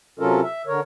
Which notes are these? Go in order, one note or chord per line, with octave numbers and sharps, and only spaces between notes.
C3 F#3 C#4 F4 A4 A#4
E5
D3 A#4 C#5